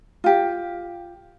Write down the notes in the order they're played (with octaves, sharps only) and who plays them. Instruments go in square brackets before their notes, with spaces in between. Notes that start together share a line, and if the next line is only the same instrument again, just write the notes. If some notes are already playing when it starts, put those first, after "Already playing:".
[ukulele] F4 G4